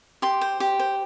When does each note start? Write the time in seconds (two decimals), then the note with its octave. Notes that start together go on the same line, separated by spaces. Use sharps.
0.22 G4 C6
0.41 C5
0.60 G4
0.80 C5